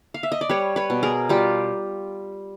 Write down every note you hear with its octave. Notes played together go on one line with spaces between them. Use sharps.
F5
E5
D#5
D5
G3 B4 C#5
B4 C#5
B2
G#4 A#4
G3 F4 G4